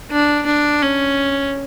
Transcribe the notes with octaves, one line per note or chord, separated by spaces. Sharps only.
D4
D4
C#4